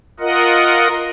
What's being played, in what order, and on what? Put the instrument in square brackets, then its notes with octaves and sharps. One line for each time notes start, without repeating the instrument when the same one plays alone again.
[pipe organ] F4 A#4 D#5 F#5